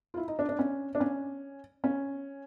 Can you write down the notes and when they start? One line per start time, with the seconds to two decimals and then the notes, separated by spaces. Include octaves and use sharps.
0.14 F4
0.17 E4
0.28 D#4
0.39 D4
0.49 D4
0.59 C#4
0.95 D4
1.00 C#4
1.84 C#4